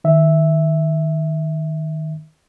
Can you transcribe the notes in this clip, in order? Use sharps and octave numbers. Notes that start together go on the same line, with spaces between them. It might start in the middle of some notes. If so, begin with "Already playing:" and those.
D#3 E5